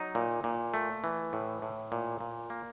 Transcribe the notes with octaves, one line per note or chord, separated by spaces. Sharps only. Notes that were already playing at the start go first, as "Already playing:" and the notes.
Already playing: F#3 D#4
A#2
A#2
A3
E3
A2
A2
A#2
A#2
A#3